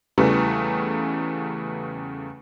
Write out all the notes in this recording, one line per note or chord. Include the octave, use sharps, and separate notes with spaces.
E2 C#3 E3 G3 A3